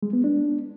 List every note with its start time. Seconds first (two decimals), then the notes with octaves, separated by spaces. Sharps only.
0.03 G#3
0.13 B3
0.24 D4